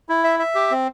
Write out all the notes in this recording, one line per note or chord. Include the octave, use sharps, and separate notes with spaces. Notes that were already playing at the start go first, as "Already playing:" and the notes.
E4
E5
E5
G4
C4